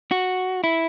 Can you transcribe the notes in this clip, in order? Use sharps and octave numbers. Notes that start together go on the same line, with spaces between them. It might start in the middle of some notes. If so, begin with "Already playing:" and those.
F#4
E4